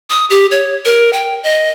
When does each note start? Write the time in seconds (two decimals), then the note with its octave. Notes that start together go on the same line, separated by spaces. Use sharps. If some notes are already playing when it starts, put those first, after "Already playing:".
0.10 D#6
0.30 G4
0.51 C#5
0.85 A#4
1.13 G5
1.44 D#5